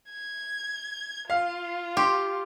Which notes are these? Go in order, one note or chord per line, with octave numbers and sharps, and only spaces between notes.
G#6
F4 F5
G4 C6